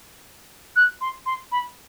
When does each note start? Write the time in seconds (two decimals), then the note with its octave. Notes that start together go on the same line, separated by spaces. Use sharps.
0.76 F#6
1.01 C6
1.26 C6
1.52 B5